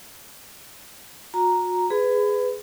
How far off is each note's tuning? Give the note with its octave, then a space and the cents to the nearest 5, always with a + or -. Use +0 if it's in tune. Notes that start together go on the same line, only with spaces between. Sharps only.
F#4 -40 A#5 +0
G#4 +0 B4 +20 B5 +30